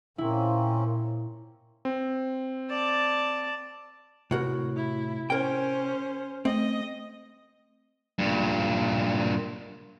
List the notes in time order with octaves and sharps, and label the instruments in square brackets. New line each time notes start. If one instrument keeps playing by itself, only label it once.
[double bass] A#2 [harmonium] A#3 C4 C#4 [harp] E4
[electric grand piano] C4
[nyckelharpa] D5 A5
[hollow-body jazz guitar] A2 F#4 A#4 [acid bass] C3
[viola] E4
[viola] C#4 C5 [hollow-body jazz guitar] A#4 G5
[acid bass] A3 [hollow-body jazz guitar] C4 [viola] D#5
[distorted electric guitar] G2 A#2